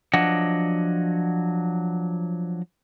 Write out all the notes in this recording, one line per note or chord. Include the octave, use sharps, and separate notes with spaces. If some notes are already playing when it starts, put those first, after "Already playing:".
F3 F#3 D4 D#5 F#5